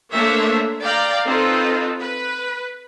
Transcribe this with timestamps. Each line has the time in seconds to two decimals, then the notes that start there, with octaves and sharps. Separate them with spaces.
0.11 A3 A#3 D4 C5 C#5 E5
0.82 D5 F5 G5 A#5
1.25 C4 D#4 F4 A4 B4
2.00 B4